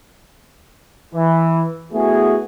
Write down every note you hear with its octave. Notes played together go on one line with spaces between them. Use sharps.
E3
A3 B3 E4 F#4 G#4